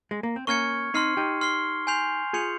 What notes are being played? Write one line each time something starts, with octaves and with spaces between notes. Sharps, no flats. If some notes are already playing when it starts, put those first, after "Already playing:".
G#3
A#3
C4
A#3 C#4 C#6 F6 G#6 C#7
C4 D#4 C6 F6 C7
D#4 G4
C6 F6 C7 G7
G#5 C6 G6 C7 F7
F4 G#4 C6 G6 C#7 F7